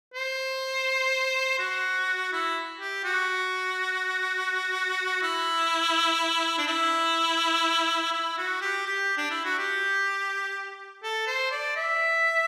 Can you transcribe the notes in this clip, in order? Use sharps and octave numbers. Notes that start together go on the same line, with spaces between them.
C5
F#4
E4
G4
F#4
E4
D4
E4
E4
F#4
G4
G4
D4
E4
F#4
G4
A4
C5
D5
E5